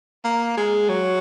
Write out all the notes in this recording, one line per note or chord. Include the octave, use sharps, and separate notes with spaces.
A#3
G#3
F#3